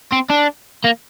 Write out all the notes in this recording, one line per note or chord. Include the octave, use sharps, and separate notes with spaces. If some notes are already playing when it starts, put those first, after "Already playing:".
C4
D4
A#3